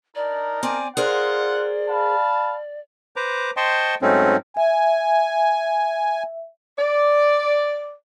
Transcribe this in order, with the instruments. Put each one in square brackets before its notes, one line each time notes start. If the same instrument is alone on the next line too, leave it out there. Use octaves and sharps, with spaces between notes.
[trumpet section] D4 D#4 A#4 [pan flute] D5
[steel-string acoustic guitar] C4 D5 [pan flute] G#5
[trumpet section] F4 F#5 [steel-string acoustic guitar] G#4 A#4 C5 [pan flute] D5
[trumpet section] F5 A5 B5
[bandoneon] B4 C5 A#5 D6
C5 D#5 G5 A5 C6 C#6
G#2 F#3 A3 C4 C#4 D#4
[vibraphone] E5 [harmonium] G#5
[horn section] D5